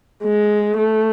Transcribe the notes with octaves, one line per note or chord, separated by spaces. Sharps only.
G#3
A3